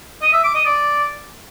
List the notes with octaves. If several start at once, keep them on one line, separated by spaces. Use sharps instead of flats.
D#5
E5
D6
D#5
D5